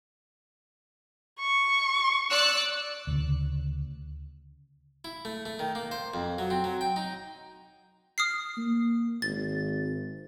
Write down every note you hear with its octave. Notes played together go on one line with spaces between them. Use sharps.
C#6
D5 E6 F#6
D2 C#3
E4
A3
A3
D#3
A#3
C5
F2
F#3
C4
F#3
G5
D#4
D#6 F6 C7
A#3
G#1 A6